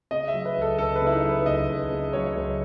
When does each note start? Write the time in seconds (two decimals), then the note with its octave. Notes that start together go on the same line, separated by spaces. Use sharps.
0.11 C#3 D#5
0.28 E5
0.34 F#3
0.45 B4
0.57 C#2 A4
0.78 C#2 A4
0.96 B4
1.01 C#3
1.06 E4
1.13 D#4
1.24 F#3
1.29 B4
1.46 C#2 D#5
1.69 C#2
1.91 C#3
2.13 F#3 C#5
2.36 C#2